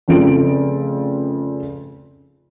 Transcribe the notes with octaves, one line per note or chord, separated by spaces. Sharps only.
F1 C#3 F3 C4 A4 D7